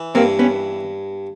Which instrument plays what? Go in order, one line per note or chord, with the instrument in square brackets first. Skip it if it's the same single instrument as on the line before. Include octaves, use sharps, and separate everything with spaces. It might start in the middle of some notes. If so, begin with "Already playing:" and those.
Already playing: [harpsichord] E3
[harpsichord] G2 [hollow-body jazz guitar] A#3 C4
[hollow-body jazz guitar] B3 C#4